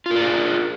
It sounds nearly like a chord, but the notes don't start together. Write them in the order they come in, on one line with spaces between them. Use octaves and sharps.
F4 A#4 D5 G#4